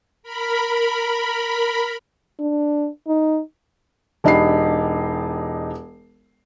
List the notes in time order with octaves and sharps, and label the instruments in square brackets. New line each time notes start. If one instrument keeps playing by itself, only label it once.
[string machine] A#4 B5
[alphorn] D4
D#4
[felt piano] E1 D4 D#4 G4 B5 C7